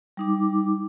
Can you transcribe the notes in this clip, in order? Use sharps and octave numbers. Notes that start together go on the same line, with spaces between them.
G3 D#4 D6